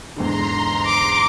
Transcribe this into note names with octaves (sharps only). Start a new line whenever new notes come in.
E2 G#2 D3 A#5 C6
D6